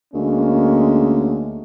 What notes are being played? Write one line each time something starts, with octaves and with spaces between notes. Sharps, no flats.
D2 G#3 A#3 C#4